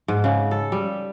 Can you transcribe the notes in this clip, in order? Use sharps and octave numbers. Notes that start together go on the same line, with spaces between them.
G#2
C#3
A4
G3